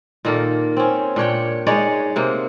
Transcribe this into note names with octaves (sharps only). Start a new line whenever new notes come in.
A#2 D#3 A#3 A4
C4 C#4
A#2 D4 C#5 G5
G#3 D#4 C#5 D5
C3 A#3